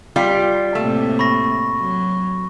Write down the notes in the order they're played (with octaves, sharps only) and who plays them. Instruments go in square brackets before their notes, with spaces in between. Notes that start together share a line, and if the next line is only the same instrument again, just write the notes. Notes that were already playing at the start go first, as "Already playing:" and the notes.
[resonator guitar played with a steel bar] G3 F4 G4
[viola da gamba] A2 C3 A#3 [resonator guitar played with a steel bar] A3
[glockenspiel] B5 C#6 A#6
[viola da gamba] F#3